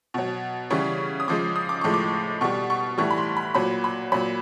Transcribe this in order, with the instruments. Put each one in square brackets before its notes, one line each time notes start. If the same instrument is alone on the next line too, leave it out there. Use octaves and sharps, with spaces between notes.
[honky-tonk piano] B2 F#3
C#3 E3 G3 C#6
D#6
C#3 F3 G#3 D6
D#6
D6
A2 F3 G#3 C#6
D6
B2 G3 C#6
C#6
A2 E3 G3 C#6
B5
C6
B5
A#2 F#3 B5
B5
A#2 F#3 B5